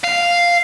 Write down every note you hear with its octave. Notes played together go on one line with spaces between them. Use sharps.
F5